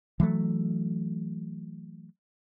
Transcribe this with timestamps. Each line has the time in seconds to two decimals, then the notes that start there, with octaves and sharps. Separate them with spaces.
0.20 E3 F#3 A3